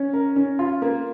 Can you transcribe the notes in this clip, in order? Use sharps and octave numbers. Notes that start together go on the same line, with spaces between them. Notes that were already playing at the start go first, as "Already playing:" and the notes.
Already playing: C#4
A#4
C#4
F4
A#3